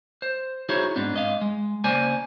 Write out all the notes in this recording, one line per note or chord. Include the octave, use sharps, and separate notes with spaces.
C5
D#4 E4 F#4 G#4 C5 C#5
G#2 B3 C4 D4
G#2 D#5 F5
G#3
C#3 A#3 C5 D5 G#5